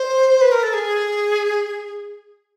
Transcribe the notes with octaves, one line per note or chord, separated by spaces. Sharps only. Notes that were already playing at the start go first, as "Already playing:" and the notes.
Already playing: C5
B4
A#4
A4
G#4